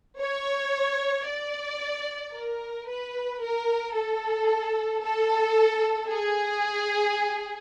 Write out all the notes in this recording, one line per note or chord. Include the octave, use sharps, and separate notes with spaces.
C#5
D5
A#4
B4
A#4
A4
A4
G#4